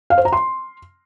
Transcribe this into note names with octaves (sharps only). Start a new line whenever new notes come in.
F5
C5
A#5
C6